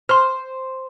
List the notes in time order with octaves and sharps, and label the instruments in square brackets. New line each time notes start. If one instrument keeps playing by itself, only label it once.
[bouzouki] C5 [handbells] C6 F6